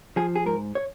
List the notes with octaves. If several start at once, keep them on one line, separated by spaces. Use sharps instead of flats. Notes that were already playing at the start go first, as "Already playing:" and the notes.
F3 G#4
G#4
G#2 A#4
C#5